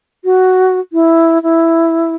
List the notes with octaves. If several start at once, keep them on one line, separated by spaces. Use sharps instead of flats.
F#4
E4
E4